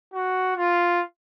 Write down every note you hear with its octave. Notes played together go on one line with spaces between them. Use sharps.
F#4
F4